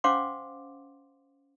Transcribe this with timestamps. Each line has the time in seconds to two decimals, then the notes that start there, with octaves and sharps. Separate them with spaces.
0.04 C#4 C5 F5 F#5 C6 D6